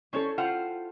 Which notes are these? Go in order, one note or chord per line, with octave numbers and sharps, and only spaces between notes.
C#4 E4 A4 C5 C#5
F4 C5 F#5 G5